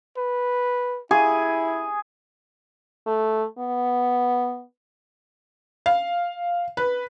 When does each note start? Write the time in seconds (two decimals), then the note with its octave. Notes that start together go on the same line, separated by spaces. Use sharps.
0.17 B4
1.11 E4 G#4
3.06 A3
3.59 B3
5.86 F5
6.77 B4